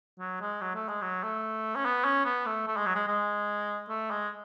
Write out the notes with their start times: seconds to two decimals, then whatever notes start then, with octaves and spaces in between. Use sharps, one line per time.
0.20 F#3
0.41 G#3
0.61 F#3
0.75 A3
0.88 G#3
1.02 F#3
1.24 A3
1.76 C#4
1.85 B3
2.04 C#4
2.25 B3
2.46 A3
2.67 A3
2.77 G#3
2.86 F#3
2.95 G#3
3.07 G#3
3.89 A3
4.11 G#3